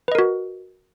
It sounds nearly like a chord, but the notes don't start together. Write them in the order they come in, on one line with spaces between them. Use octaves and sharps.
B4 D#5 A#4 F#4